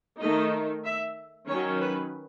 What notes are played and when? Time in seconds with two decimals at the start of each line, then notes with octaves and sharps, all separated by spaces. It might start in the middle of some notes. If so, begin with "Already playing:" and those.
0.20 D#3 A3 D#4 D#5
0.85 E5
1.48 D#3 F#3 C#4 C#5
1.81 B4